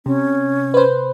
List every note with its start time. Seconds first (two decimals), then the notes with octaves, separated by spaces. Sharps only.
0.06 C3 C#4
0.74 B4 C5